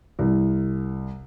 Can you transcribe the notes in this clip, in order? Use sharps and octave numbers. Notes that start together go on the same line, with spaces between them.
C2